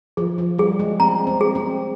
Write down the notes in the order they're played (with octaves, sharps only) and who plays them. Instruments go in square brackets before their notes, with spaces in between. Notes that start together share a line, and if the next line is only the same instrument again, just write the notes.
[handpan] F3 [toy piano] G#4
[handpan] F3
[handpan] G3 [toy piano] G#4
[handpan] G#3
[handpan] C4 [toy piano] A#5
[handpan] C4
[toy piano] G#4
[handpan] C4